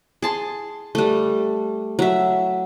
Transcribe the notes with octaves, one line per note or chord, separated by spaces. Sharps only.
G#4 A5 C6
G3 A3
F#3 E5